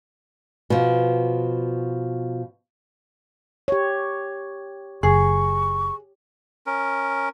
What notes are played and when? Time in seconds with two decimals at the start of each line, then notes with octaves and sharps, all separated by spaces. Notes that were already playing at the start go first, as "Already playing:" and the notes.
0.70 B2 F3
3.68 G4 C#5
5.03 F#1 G#4 C#6
6.67 C#4 A#4